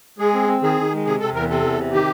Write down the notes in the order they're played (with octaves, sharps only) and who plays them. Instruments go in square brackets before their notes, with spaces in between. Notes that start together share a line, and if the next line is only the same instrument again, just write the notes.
[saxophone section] G#3 [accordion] G#4
[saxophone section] C4
C4
[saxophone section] D#3 [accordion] G#4
[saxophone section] D#3
G#3
[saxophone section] C3 [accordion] G#4
[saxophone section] C3 [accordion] A4
[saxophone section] E2 [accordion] A#4
[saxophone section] C3 [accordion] A4
[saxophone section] E2
C3
[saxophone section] D#3 [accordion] G4